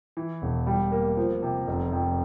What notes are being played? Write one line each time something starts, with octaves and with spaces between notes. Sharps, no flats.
E3
E1
G3
A#3
F3
C3
F1
F2